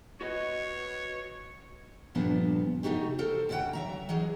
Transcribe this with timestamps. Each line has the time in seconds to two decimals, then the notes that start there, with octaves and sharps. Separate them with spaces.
0.21 F#4 B4 C#5 D#5
2.15 D2 G2 A#2 F3 B3 D4
2.83 C3 A3 D#4 F#4 G4
3.18 A4 A#4 C5
3.49 D2 C#3 E4 F#4 F#5 G5
3.73 F#3 E5 A#5
4.09 E3 F#3 G#3 D#4